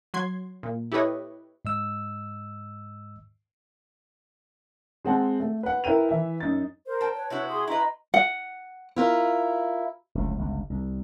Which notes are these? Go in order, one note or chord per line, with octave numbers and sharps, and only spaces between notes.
F#3 C6 G#6
A#2
E4 G4 A4 B4 C#5 D#5
G#2 D#5 E6
G#3 C4 F#5 A5
A3
B4 F#5
E4 A#4 B4 G5 D#7 F7
E3 E5
F#2 D#4 A6
A#4 C5
G5 A5
B4 C#5
C3 E4 F#4
G#4 C6 D#6
E4 B4 D#5 A#5 C6
F#5
E4 F4 A#4
F1 C#2 A2
G1 C#2
C2